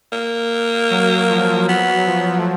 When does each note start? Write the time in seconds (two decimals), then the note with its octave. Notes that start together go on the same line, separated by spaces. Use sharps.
0.12 A#3
0.91 F#3
1.30 F3
1.68 F#3 B3
2.07 F3
2.39 A3